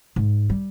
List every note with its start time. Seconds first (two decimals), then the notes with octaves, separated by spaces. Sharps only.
0.16 G#2
0.50 G3